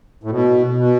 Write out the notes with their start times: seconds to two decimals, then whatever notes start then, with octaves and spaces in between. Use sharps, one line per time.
0.24 A2
0.31 B2
0.76 B2